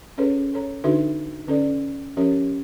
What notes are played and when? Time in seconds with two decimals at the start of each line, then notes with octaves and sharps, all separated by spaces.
0.18 C#4 G#4 A4 B4 C#5
0.54 A4 C#5 A#5
0.84 D3 D4 D#4 F#4 A4 E5
1.47 D3 C#4 A4 D5
2.17 F3 C#4 G4 A#4 C#5